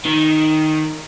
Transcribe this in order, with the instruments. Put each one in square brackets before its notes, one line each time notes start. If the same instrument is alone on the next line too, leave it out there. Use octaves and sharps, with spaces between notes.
[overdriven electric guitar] D#3